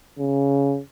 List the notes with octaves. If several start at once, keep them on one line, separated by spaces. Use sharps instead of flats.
C#3